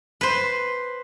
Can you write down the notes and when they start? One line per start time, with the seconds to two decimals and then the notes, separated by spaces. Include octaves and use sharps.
0.21 B4 C5